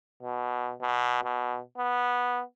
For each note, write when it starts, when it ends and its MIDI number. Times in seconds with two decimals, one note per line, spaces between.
0.23 0.73 47
0.82 1.22 47
1.24 1.60 47
1.78 2.42 59